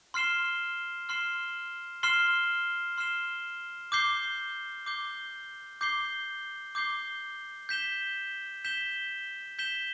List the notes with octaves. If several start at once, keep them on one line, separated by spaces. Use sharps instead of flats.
C6 F6 C7 E7 G7
C6 F6 C7 E7 G7
C6 F6 C7 E7 G7
C6 F6 C7 E7 G7
D6 G6 C7 G7
D6 G6 C7 G7
D6 G6 C7 G7
D6 G6 C7 G7
G6 B6 E7 G7
G6 B6 E7 G7
G6 B6 E7 G7